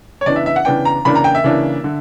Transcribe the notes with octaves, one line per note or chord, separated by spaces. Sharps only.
C#5
C#3 E3 B3 D4 D5
E5
E5
F#5
C#3 E3 B3 D4 G5
A#5
C#3 E3 A#3 D4 B5
A#5
G5
E5
C#3 E3 A#3 D4
D3